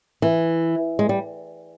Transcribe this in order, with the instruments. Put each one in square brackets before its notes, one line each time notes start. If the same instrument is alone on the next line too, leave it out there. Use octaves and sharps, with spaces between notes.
[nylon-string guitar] E3
G#3
G3